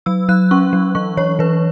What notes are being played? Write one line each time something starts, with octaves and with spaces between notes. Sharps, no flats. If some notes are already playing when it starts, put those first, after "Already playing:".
F#3 E6
F#3 F#6
C#4 C#6
F#3
E3 C#6
E3 C#5
E3 B4